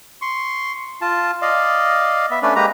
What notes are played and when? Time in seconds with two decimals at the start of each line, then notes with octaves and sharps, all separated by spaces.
0.22 C6 C#6
1.02 F4 A5
1.42 D5 D#5 F5
2.31 B3 E5
2.43 A3 C#4 D4 B4 D5
2.56 G#3 A#3 G4 B4 A#5